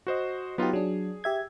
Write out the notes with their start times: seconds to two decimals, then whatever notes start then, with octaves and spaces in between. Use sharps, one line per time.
0.07 F#4 C5 D#5
0.58 F#3 B3 D#4 F4 G4
0.73 F#3 D4 G#4
1.24 G4 E5 G#6